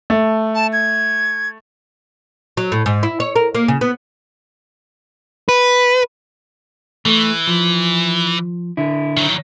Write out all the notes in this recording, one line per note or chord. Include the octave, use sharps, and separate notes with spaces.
A3
A5
G#6
F#3
A2
G#2
E4
C#5
A#4
A#3
C#3
B3
B4
E3 A3
F3
D3 E4
D#3 F#3